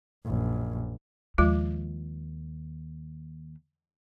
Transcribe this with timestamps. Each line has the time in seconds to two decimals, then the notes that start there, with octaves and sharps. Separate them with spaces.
0.25 A#1 F#2
1.38 D#2 F3 G#3 F4